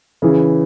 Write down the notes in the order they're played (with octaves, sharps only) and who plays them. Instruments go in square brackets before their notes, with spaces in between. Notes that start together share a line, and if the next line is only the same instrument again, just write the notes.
[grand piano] C#3 E3